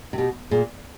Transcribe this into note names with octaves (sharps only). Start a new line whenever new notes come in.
C3
B2 G4
A#2 G#4